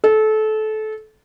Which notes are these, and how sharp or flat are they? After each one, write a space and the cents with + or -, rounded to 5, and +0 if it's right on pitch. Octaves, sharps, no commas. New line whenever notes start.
A4 -25